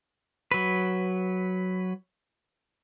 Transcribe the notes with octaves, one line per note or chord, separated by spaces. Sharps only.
F#3 B4